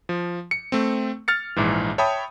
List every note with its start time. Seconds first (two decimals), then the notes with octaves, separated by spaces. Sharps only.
0.09 F3
0.51 C#7
0.72 A3 C4
1.28 F6 A6 C#7
1.56 A#1 G#2 E3
1.98 C#5 E5 G5 A5 B5 D#6